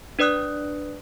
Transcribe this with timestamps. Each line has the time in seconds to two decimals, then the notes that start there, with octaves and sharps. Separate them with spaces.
0.19 D4 B4 D5 D#6 F#6